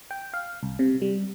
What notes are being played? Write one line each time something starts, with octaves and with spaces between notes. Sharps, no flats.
G5
F5
C2
C3
G3